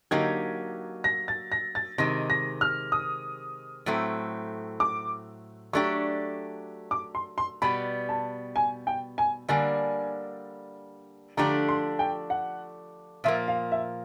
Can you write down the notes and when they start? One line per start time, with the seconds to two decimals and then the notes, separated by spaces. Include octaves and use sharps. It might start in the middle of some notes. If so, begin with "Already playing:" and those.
0.11 D3 F#3 A#3 D#4 G4 G#6
1.04 A#6
1.28 A6
1.52 A#6
1.75 A6
1.98 C3 D#3 G#3 A#6
2.30 A#6
2.61 F6
2.92 D#6
3.86 A2 F#3 A3 C4
4.80 D6
5.73 F#3 A3 D4 G4 C#6
6.91 D6
7.15 C6
7.38 C6
7.62 B2 G3 B3 B5
8.09 A5
8.56 G#5
8.87 G5
9.18 G#5
9.48 D3 G3 A#3 D4 G#5
11.37 D3 F3 A3 D4 G4 A#5
11.69 C6
11.99 G5
12.30 F#5
13.24 A#2 F3 A#3 E5
13.48 F5
13.72 E5